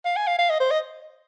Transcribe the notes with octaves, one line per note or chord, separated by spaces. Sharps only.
F5
G#5
F5
F5
D#5
C5
D#5